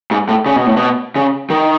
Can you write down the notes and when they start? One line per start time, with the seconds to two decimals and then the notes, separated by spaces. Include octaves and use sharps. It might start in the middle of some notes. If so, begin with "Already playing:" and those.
0.11 G#2
0.29 A2
0.46 C#3
0.56 B2
0.66 A2
0.77 B2
1.16 C#3
1.50 D#3